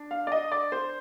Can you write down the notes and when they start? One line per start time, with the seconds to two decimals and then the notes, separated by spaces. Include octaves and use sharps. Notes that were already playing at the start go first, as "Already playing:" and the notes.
Already playing: D4
0.11 F5
0.27 D5
0.32 D#5
0.52 D5
0.72 C5